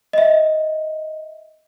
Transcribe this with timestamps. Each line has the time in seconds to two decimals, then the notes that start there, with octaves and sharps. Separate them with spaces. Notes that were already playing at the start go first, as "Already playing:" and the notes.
0.13 D#5 E5